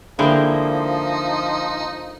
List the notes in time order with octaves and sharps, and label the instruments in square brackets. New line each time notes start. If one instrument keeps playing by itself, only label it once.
[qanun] D3 A#3 [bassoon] F3 [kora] G#3 E4 G5 [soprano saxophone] D#4